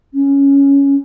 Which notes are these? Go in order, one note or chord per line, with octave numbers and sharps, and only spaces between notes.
C#4